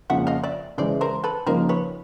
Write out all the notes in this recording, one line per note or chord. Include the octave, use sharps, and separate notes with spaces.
F2 C#3 F3 A#3 E5 F#5
D#5 F5
D5 E5
C#3 E3 G#3 C5 D5
A#4 C5
A4 B4
C#3 F3 A#3 D#4 A#4 C5
B4 C#5